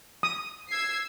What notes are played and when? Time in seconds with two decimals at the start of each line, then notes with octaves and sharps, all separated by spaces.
0.23 D#6
0.69 E6 G#6 C7